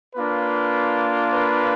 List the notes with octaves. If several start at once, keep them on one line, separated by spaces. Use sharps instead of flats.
A#3 D4 F4 B4
B4